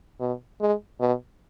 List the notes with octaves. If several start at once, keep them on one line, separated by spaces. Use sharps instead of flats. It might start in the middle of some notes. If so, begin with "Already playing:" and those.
B2
G#3
B2